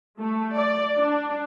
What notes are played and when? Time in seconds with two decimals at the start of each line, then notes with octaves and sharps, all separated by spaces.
0.20 A3
0.57 D5
0.97 D4